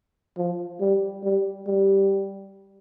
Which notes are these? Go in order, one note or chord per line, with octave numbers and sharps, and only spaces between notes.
F3
G3
G3
G3